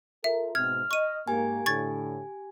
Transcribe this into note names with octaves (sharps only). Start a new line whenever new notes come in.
F4 A4 A#4 E5
G#2 B2 C4 F6 G#6
D#5 C#6 D#7
G#2 A#3 G4 G#5
A2 D3 C#6 G#6 A6